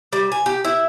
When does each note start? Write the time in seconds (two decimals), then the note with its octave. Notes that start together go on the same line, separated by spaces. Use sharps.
0.13 G3
0.32 G#5
0.46 G4
0.65 E4